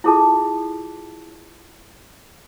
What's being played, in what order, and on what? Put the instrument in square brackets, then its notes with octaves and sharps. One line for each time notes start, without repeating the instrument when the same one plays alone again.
[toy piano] E4 F4 G#4 A4 A5